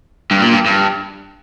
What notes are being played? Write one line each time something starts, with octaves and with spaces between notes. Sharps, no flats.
G2
A#2
G2
G2